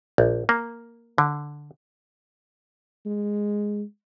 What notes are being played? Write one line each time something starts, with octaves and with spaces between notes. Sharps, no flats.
A#1
A#3
D3
G#3